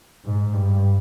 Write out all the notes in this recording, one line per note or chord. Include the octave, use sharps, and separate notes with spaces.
G#2
G2